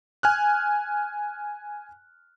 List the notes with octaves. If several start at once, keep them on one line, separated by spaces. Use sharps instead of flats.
G#5 F6 F#6